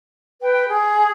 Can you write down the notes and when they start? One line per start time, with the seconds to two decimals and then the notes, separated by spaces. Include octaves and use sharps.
0.40 B4 G5
0.69 G#4